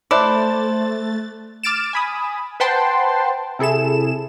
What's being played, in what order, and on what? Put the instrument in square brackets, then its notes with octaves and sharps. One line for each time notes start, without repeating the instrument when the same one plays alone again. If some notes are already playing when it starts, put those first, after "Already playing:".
[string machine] A3 A6 [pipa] E4 D5 [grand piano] C5 A5 F#6
[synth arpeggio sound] D6 F6 A6 D7 E7
G#5 B5 D#6
B4 C5 F#5 G5 A5 C6
C3 E4 G#4 A4 E7